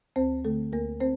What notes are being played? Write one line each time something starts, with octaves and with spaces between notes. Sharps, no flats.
D2 C4 C5
D3 A3 A4
D2 A#3 A#4
C4 C5